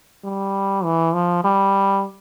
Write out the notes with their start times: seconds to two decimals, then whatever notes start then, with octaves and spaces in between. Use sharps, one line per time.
0.24 G3
0.84 E3
1.14 F3
1.44 G3